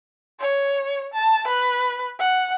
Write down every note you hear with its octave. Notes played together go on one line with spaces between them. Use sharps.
C#5
A5
B4
F#5